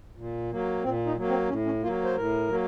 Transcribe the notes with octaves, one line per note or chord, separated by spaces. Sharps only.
A#2
F#3 A#3
A#2 C4
D#4
F#3 A#3
C4
A2 C#4
C#4
F#3 A#3 F4
C5
A2 A#4
F#3 A#3